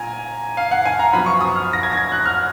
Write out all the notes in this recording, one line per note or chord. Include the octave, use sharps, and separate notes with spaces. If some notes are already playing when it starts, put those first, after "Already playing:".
Already playing: A#2 G#5 A#5
F5
F#5
G#5
A#5
F#2 F3 B3 B5
C#6
D#6
F6
A#6
G#6
A#6
G#6
F#6
F6